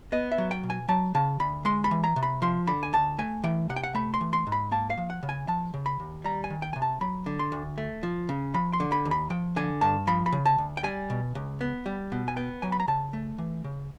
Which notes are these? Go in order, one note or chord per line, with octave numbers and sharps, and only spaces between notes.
B3 D#5
E5
F#3
G5
B2
G#5
F#3 A5
C#3 A5
D2 B5
G#3 C6
B5
E3
A#5
C3
B5
F3 C6
D3 B5
G#5
D2 A5
A3 G#5
E3 G5
C3 F#5
G5
F#5
A3 B5
C6
E3
C6
G#2
B5
A#3 A5
F5
F3
F#5
C#3
G#5
F3 A5
C#3
B5
D#2
G3 A#5
G#5
D#3
G5
C3 G#5
A5
F#3 B5
D3
C6
D2
A3
F3
C#3
F3 B5
C6
D3
B5
D#2
B5
F3 G5
D3 G#5
G2 A5
F3 B5
B5
C#3
A5
D2
G5
G3 G#5
B2
C#2
B3
G3
B2
G#5
B3 G5
F#3 G#5
B5
A#5
C#3 A5
A3
E3
C#3